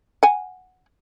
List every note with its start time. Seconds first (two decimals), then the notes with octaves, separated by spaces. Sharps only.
0.23 F#5 G#5